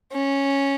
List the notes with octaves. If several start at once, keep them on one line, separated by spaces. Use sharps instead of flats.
C#4